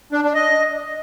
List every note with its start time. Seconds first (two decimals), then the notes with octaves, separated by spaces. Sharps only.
0.12 D4
0.23 D4
0.35 D#5